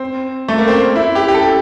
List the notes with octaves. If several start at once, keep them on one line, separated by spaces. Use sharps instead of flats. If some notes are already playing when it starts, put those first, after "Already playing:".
Already playing: C4
A3
A#3
C4
E4
G4
G4
A4